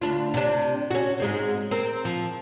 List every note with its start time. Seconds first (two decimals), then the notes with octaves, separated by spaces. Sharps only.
0.02 D2 D4 F4
0.34 C3 D4
0.91 C#4 F#4
1.20 G#2 G#3 C4
1.71 C4 A#4
2.05 F3